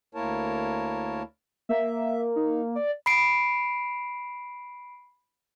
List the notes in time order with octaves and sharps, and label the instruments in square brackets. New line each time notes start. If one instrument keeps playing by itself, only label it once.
[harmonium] D2 A#3 E4 A#4 C#5 A5
[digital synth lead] A#3 [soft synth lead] E5
[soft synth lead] D#4
D5
[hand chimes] B5 C7 D7